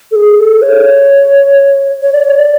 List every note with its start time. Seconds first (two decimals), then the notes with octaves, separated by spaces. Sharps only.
0.11 A4
0.16 G#4
0.40 A4
0.62 C#5
2.03 C#5
2.13 D5
2.24 C#5
2.37 D5